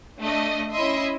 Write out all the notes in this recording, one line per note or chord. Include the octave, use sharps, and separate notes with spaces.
A3 D4 D#5
C#4 E4 D#5 E5 C6